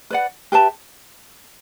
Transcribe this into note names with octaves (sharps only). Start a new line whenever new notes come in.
B4 D5 F#5
G4 B4 E5 A5